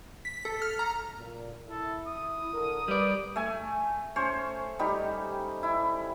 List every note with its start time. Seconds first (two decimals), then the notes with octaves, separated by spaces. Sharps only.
0.25 B6
0.45 A4
0.62 F6
0.79 A#5
1.18 A#2
1.68 E4 A4
2.07 D#6
2.53 D3 A#4
2.88 G3 B4 D5
3.36 A3 G#5
4.16 C#4 C5 C#5
4.79 G3 D#4 G4
5.63 E4